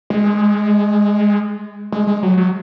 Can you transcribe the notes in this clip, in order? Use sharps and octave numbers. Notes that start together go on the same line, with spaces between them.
G#3
G#3
G#3
F#3
F#3